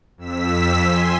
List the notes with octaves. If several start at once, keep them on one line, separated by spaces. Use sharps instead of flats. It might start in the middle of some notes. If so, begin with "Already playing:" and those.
F2 E6 B6
G#5 C6